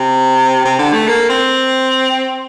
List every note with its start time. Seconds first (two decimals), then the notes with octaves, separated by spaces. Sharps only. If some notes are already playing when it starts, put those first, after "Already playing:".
Already playing: C3
0.65 C3
0.79 D3
0.93 A3
1.08 A#3
1.29 C4